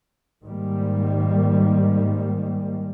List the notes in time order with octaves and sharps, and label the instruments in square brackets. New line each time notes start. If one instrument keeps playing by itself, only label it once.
[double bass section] G#2 D#3 G3 A#3